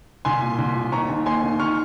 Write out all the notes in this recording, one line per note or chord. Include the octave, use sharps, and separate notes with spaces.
C2 G#5 C6
A#2
C2
A#2
D#2 A#5 C#6
D#3
D#2 G#5 C6
D#3
D#3 C#6 F6